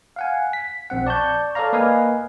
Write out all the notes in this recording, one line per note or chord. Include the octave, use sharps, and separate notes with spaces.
F5 F#5 G#5
B6
A#1 C4 F#5
D5 A5 C#6 G6
A4 C#5 D5 F5 A#5
A#3 B4 D#5 F5 G#5